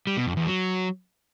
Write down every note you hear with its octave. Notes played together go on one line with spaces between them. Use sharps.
G3
B2
F2
E2
F#3